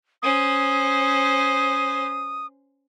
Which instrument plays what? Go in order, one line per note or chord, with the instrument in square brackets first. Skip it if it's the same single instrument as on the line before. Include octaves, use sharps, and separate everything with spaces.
[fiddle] C#4 C5 [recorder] D#6